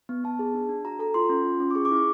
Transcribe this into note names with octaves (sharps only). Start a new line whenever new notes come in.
B3
B3 A5
G#4
D4
D4
F#4 A#5
A4 A#5
F4 C6
C#4
F4
C#4
D6
G#4 C#6
D6
E4 C#6